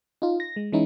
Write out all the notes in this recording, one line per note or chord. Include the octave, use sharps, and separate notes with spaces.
D#4 F4
A#6
G#3
E3 G#3 C#4 D#4 E4